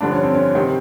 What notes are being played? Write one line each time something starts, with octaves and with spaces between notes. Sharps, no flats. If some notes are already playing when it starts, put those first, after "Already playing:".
G2 D3 F3 D4
C#4
C4
C#4
C3 D#3 C4